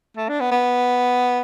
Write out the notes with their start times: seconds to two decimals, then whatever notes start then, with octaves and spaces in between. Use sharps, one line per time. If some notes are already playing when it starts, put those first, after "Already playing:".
0.17 A3
0.29 D4
0.40 B3
0.52 B3